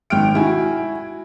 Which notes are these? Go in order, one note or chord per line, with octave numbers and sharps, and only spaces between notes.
G#1 G5 F6 D7
E4 F#4 G#5